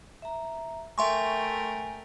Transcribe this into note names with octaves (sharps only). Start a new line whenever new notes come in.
E5 A#5
A3 A#4 E5 G5 G#5 C6 C#6